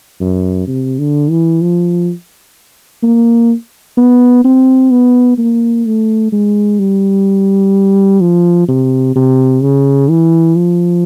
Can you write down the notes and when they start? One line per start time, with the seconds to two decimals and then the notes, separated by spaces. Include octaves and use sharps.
0.21 F#2
0.68 C3
0.99 D3
1.30 E3
1.62 F3
3.03 A#3
3.98 B3
4.45 C4
4.91 B3
5.38 A#3
5.86 A3
6.32 G#3
6.80 G3
8.21 F3
8.69 C3
9.16 C3
9.63 C#3
10.10 E3
10.56 F3